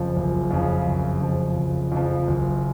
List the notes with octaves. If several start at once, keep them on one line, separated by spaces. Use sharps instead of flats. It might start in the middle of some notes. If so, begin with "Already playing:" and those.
Already playing: F#1 F2 C#3 F3
F#1
F2 C#3 F3
F#1
F2 C#3 F3
F#1
F2 C#3 F3
F#1